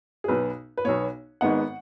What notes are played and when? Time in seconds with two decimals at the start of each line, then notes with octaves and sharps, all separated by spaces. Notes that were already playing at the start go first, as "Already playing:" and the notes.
0.24 G#4
0.28 B1 B2 B3 B4
0.77 B4
0.85 B1 B2 B3 C#5
1.41 G#1 G#2 G#3 B3 F#5